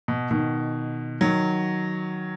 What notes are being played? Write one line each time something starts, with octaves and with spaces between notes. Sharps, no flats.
B2
B2 D#3
D#3 F#3